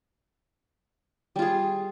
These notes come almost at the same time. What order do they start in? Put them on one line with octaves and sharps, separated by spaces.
G3 F4 G#4